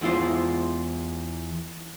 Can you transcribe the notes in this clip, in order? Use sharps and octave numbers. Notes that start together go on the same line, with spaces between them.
E2 G#3 E4 F4 C5